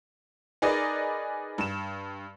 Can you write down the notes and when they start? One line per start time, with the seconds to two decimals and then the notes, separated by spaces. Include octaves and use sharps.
0.62 D#4 G#4 A#4 B4 D5 D#5
1.58 G2 E7